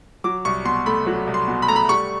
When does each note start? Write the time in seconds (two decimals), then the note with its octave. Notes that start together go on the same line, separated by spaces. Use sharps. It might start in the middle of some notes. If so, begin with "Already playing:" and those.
0.24 F#3 D6
0.45 C2 C#6
0.65 B2 C6
0.86 A3 B5
1.07 F#3
1.27 C2
1.34 C6
1.47 B2
1.62 B5
1.68 A3 A#5
1.76 B5
1.89 G3 C#6